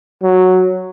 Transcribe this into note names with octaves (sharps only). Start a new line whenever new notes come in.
F#3